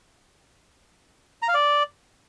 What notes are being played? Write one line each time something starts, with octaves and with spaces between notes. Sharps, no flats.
A#5
F5
D5